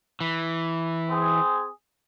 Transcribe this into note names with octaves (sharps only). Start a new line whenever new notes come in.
E3
C4 G#4